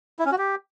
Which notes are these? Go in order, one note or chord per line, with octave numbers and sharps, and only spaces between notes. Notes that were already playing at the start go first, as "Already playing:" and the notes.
E4
C#4
F#4
G4